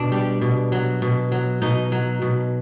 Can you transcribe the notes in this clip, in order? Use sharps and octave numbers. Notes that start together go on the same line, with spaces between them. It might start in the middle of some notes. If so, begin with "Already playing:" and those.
Already playing: B2 D4
G3
B2
F#3
B2
F#3
B2 D#4
F#3
B2